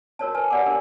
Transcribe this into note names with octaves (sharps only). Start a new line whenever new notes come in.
F#4 A#4 C#5 A5
A#4 B4 G#5 A5
G4 D5 F#5 D6
D4 G4 A#4 G#5 D6